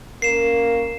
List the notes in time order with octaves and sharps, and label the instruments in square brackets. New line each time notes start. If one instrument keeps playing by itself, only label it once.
[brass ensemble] A#3 C#4 A#4 [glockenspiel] C7 E7